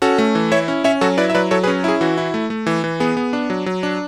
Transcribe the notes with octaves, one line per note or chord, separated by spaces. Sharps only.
C#4 F#4 A4
A3
E3
E4 C#5 E5
C#4
C#4 C#5 E5
F#3 F#4 A4
E4 B4 D5
E5
F#3 B4 D5
F#3 A4 C#5
G#4 B4
C#4
E4 G#4
E3 F#4
E4
A3
A3
E3
E3
B3 G#4
B3
D4
F#3
F#3
D4